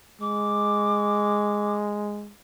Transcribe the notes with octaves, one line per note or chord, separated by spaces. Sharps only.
G#3 D6